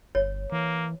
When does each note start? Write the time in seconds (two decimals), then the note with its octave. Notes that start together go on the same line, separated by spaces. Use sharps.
0.15 G1 C#5
0.52 E3 A#3